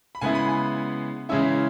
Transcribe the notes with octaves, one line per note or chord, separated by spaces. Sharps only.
B5
C#3 G#3 B3 E4 G#5
B5
G#5
C#3 E3 G#3 C#4 E4 E5